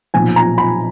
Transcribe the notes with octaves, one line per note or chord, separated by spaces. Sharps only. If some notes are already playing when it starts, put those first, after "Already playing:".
B1 A#2 F3 G#5
A#5
B5